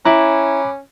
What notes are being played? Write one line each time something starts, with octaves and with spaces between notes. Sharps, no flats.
C#4 E4 A#5 B5 D6 F#6